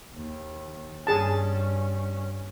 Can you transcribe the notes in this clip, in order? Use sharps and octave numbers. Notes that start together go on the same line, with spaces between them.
D#2
G2 C#4 G#4 A5